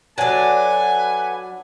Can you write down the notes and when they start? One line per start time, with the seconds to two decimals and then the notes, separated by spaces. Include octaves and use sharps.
0.18 F#3 D4 A4 B4 F#5 G#5